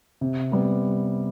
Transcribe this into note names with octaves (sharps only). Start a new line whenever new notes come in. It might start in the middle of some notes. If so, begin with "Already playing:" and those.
C3
G3 B3